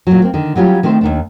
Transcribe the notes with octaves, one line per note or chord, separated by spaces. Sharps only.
A#2 F#3
A#3 C4
D3 D#3
F#3 G3 C#4 F4 G4
D#3 A3 C4 C5
D#2 D#3 D4